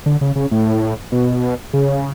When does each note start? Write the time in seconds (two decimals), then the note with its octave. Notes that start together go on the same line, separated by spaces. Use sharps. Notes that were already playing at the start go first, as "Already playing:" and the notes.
0.06 D3
0.21 C#3
0.36 C#3
0.51 A2
1.12 B2
1.73 C#3